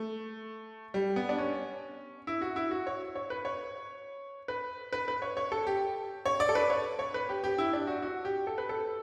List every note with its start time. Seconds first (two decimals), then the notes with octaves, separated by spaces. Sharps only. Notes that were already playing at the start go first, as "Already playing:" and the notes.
Already playing: A3
0.94 G3
1.16 B3
1.29 D4
1.38 C#4
2.27 E4
2.41 F#4
2.56 E4
2.71 F#4
2.87 C#5
3.15 C#5
3.30 B4
3.45 C#5
4.48 B4
4.93 B4
5.08 B4
5.22 C#5
5.37 C#5
5.52 A4
5.67 G4
6.26 C#5
6.40 D5
6.49 A4
6.55 B4
6.70 C#5
6.99 C#5
7.14 B4
7.29 G4
7.44 G4
7.58 E4
7.73 D4
7.87 F#4
8.02 F#4
8.25 G4
8.47 A4
8.58 B4
8.69 A4